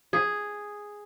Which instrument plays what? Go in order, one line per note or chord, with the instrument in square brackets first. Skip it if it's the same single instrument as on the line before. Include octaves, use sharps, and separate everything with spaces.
[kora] G#4